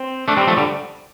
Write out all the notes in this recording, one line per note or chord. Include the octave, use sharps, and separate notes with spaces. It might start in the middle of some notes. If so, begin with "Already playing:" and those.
Already playing: C4
A3 D4
G3 C4
F3 A3
D3 G3